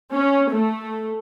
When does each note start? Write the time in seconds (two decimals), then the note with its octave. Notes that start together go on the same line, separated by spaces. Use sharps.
0.12 C#4
0.51 A3